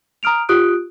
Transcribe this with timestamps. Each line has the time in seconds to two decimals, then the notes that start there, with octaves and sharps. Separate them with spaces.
0.23 A#5 D#6 F6 D7 F7
0.49 F4 G4 D#6 F#6 D7